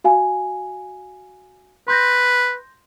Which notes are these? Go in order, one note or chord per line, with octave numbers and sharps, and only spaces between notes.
F#4 F5 G#5
B4 C6 G6 A#6